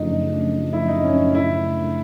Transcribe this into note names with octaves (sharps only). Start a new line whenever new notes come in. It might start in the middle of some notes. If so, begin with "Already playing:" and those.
Already playing: F#2 C#3 F3 A3 D4 D#4
E4
D#4
C#4
E4